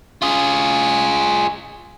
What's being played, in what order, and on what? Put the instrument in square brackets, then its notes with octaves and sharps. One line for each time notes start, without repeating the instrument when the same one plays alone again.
[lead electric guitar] F4 G#4